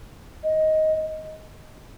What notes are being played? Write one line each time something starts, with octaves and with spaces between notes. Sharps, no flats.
D#5